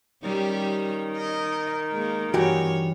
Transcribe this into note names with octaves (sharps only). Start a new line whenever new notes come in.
D#3 G3 C#4 G4
D#5
G#3 A#3
G2 E3 F#4 G4 C#5